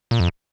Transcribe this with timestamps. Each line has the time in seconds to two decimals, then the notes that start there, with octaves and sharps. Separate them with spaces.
0.11 A#2
0.20 F2